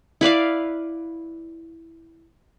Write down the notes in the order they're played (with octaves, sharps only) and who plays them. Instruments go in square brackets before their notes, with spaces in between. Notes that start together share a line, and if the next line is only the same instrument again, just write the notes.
[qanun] E4 B4 D5 F5